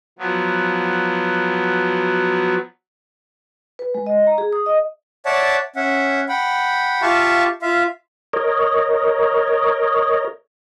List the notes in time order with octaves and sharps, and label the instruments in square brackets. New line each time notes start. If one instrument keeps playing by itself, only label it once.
[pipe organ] F3 F#3 B3
[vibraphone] B4
G#3
D#5
A#5
G#4
D#6
D#5
[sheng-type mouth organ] C#5 D5 E5 F#5 A5
C#4 E5 F#5
F#5 G5 B5
F4 G4 E5 F5 A5 C#6
F4 E5 F5
[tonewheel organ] A#4 C#5 D#5